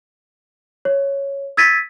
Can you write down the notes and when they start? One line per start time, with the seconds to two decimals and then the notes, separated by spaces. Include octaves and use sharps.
0.85 C#5
1.57 E6 G#6 A6 B6 D#7